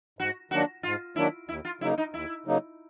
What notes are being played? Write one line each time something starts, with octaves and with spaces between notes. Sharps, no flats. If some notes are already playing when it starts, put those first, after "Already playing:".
G#2 F#4
D#3 F#3 A#3 D4 F#4
G#2 F4
D#3 F#3 A#3 D4 E4
D#2 E4
F4
C#3 F#3 A#3 D#4 E4
D#4
D#2 E4
C#3 F#3 A#3 D#4